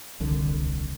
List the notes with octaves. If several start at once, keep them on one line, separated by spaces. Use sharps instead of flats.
D#1 C2 D3 D#3